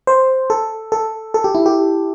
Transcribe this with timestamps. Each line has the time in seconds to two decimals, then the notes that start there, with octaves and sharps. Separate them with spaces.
0.07 C5
0.50 A4
0.92 A4
1.34 A4
1.44 G4
1.55 E4
1.66 G4